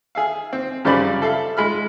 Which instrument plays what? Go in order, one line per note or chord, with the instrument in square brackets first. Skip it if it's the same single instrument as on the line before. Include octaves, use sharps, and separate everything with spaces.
[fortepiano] G#4 E5 F5
C4
F#2 C#3 G3 C5 D5 B5
A4 E5 F5
G#3 B5 F6